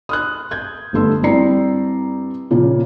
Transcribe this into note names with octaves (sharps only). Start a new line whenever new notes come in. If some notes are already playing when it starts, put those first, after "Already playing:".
D#6 F6 F#6
G6 G#6
G1 G2 A3 C6 E6
G2 C4 E4 D5 A#5 C7
A#2 C#3 F3 A#3